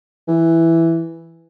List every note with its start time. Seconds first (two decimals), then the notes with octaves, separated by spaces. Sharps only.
0.28 E3